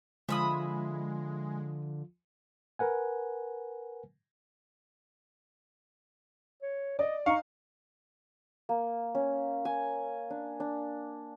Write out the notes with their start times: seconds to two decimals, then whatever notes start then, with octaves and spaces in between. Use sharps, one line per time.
0.29 D3 F3 G#3 F4 E5 B5 D#6
2.79 A#4 B4 F#5 G#5
6.62 C#5
6.99 D5 D#5
7.26 D#4 F5 A#5 C#6
8.69 A#3
9.15 C#4
9.65 G#5
10.30 D4
10.60 D4